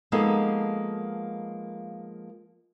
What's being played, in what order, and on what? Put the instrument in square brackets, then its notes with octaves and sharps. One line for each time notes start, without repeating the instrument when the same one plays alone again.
[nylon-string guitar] F3 G#3 A#3 B3 D#4 A4